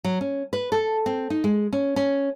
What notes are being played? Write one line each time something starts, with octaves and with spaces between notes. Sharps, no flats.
F#3
C#4
B4
A4
C4
D#4
G#3
C#4
C#4